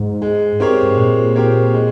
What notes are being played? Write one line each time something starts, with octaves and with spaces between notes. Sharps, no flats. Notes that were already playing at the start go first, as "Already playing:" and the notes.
Already playing: G#2
G#3
C4 G4 A#4 C#5
G2
G#2
A#2 G#3
C4 G4 A#4 C#5
G#3